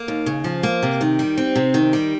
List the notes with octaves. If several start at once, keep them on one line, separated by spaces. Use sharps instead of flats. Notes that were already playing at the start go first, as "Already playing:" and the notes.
Already playing: A#3
D#2
C#3
F3
A#3
C3
D#3
G3
C4
C3
D#3
G3